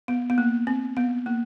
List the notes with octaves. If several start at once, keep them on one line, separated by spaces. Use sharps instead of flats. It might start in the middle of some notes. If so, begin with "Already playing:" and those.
B3
B3
A#3
C4
B3
A#3